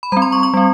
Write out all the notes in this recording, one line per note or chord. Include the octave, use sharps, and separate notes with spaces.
B5
G3 C4 A#5
C6
C#6
C#6
G3 C4